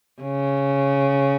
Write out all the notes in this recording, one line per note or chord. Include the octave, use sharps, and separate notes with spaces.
C#3